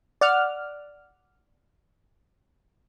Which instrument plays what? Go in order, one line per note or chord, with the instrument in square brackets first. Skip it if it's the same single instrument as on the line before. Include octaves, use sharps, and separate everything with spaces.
[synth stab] D5 F#5 F6